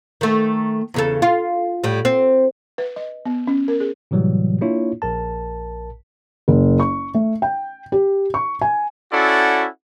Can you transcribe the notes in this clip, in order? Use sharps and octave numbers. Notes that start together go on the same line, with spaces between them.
D#3 A3
E2 C#3 A4
F4
A2 G3
C4
B4
D#5
B3
C#4
A#4
G#4
A2 C3 E3 F#3 G3
A#3 D4 E4 F4 C#5
A#1 A#4 A5
F#1
C#6
A3
G5
G4
C#6
G#5
C#4 E4 F#4 A4 D5 F#5